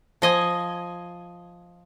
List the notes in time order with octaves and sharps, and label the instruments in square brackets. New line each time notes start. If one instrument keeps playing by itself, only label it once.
[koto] F3 D#5 G#5